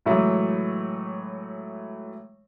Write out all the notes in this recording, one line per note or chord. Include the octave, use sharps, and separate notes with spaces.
A2 E3 F#3 G#3 A3